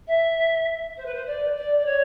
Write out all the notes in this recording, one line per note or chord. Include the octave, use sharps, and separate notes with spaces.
E5
C5
B4
C5
D5
D5
D5
C#5